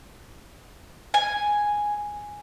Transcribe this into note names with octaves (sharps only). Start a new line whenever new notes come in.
G#5